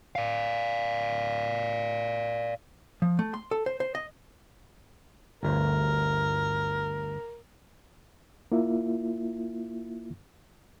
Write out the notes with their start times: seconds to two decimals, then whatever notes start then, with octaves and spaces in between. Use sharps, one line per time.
0.15 D5 F5
3.02 F3
3.19 A3
3.34 C6
3.51 A4
3.66 C5
3.80 C5
3.95 D#5
5.43 G1 D2 A#4
8.52 A#3 E4 F4 E5